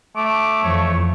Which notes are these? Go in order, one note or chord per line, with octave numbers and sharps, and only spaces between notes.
A3 D6
F2 E3 C#5